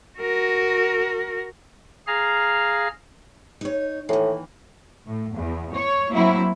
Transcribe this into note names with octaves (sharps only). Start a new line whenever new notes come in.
F#4 A#4
G#4 F5 A#5 F6
D#4 C#5
D#2 A2 E3
A2
E2
C#5
F#3 A#3 C4 E4